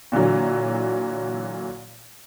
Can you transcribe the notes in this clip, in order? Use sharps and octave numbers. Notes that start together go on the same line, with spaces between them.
A#2 D3 E3 F#3